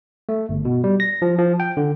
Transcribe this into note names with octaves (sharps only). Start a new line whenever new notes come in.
A3
G1
B2
G3
A#6
F3
F3
G5
D3